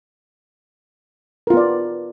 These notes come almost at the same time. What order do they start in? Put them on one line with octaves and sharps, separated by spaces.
A#4 F4 B3 D5